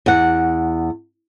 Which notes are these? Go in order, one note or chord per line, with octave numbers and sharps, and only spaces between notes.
E2 F#5